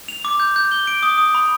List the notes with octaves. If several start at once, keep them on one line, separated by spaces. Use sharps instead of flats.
F7
D6
G6
G6
G7
D7
D#6
D#6
B5